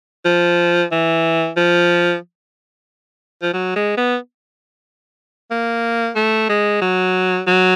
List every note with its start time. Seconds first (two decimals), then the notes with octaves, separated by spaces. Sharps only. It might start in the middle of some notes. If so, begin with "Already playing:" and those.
0.25 F3
0.92 E3
1.57 F3
3.42 F3
3.53 F#3
3.76 G#3
3.97 B3
5.51 A#3
6.16 A3
6.49 G#3
6.82 F#3
7.47 F#3